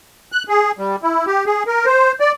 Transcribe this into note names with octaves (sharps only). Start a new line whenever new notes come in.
F#6
G#4
G3
E4
G4
G#4
A#4
C5
D5